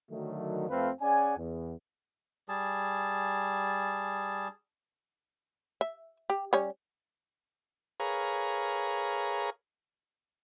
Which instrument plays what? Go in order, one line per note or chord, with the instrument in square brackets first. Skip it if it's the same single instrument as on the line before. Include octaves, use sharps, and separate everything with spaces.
[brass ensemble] D3 D#3 F#3 A3
F2 A3 C4 F4 B4 F5
C#4 G#4 D5 F#5 G#5
E2
[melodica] G3 G#4 A5
[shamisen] E5
G4
G3 C#4 C#5
[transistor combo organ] G#4 A#4 B4 C#5 F5 A#5